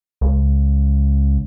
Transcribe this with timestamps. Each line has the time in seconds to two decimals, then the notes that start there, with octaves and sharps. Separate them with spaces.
0.21 C#2